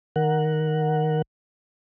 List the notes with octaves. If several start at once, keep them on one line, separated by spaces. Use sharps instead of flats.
D#3 A#4 F#5